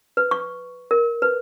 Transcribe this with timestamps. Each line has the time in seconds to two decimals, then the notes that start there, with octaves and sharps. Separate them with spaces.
0.17 B4
0.31 C#6
0.91 A#4
1.22 B4